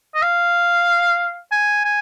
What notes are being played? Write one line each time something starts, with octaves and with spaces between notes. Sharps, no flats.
D#5
F5
G#5
G#5